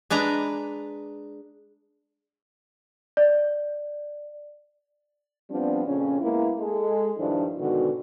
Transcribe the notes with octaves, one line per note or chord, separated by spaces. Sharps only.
G#3 D4 B4 A#5
D5
F3 G3 B3 C4 D4
F2 A#2 C#3 C#4
G#3 A#3 B3 E4
G#3 A4
G2 D#3 F3 D4 E4
G#2 B2 D3 D#3 F#4